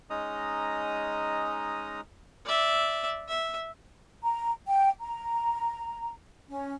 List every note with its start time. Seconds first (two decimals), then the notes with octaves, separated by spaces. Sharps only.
0.10 G#3 C#4 D#4 D#5 A#5 D#6
2.45 D5 E5
3.28 E5
4.23 A#5
4.68 G5
5.01 A#5
6.49 C#4